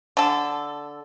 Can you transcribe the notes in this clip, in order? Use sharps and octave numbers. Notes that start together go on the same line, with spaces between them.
D3 A4